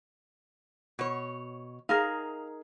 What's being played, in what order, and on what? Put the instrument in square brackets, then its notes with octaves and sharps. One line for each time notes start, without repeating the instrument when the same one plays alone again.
[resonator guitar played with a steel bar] B2 C#5
[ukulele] D#4 G#4 A#4 [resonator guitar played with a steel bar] F5